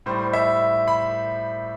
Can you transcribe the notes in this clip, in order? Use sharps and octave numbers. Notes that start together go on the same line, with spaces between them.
A2 G3 C5
E5
B5